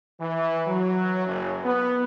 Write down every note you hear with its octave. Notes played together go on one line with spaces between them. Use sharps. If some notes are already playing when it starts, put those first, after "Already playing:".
E3
F#3
F#1
B3